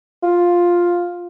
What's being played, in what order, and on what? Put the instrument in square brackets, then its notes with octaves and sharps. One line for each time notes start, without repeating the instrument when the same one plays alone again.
[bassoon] F4